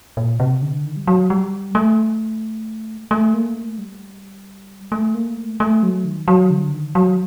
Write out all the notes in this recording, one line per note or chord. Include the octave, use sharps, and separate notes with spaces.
A#2
C3
D3
D#3
G3
F#3
G3
A3
A3
A#3
A3
G3
A3
A#3
A3
A3
F#3
D#3
F#3
D3
D#3
F#3